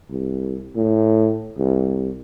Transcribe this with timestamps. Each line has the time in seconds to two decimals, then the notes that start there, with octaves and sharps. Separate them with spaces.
0.10 C2
0.76 A2
1.58 C2